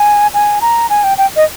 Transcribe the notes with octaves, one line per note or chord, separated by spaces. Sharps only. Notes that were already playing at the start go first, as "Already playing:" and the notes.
Already playing: G#5
G#5
A#5
G#5
G5
G5
D#5